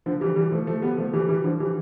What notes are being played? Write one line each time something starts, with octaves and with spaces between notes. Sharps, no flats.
D3 F3
E3 G3
E3 G3
F3 A3
F3 A3
G3 B3
F3 A3
E3 G3
E3 G3
D3 F3
E3 G3